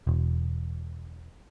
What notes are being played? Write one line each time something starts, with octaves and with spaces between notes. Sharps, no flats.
E1